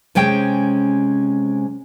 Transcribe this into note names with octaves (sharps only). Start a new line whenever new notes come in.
C3 G#3 C#4 G5